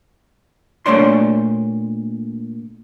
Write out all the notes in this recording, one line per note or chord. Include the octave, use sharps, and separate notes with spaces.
A#2 A3 D4 C#5 D5 C6